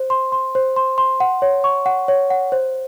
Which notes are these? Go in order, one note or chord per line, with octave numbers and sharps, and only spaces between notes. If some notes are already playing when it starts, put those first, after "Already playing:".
Already playing: C5
C6
C6
C5
C6
C6
F#5
C#5
C#6
F#5
C#5
F#5
C5